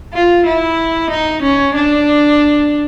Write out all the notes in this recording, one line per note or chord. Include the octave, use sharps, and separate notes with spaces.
F4
E4
D#4
C#4
D4